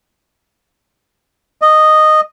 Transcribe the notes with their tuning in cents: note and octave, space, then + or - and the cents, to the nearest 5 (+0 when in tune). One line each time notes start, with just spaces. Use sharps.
D#5 -10